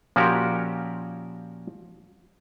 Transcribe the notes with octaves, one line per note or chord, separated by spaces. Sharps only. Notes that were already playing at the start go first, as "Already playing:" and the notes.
A#2 F3 C#4 F#4 G4 A#4